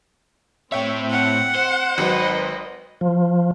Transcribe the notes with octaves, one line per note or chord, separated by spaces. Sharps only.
A2 C4 C#5 E5 G5
F#5
C5
G#1 F#3 B4 D#5
F3